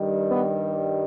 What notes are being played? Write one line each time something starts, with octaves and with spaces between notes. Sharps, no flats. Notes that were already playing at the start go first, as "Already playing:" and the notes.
Already playing: G2 D#3 G3
B3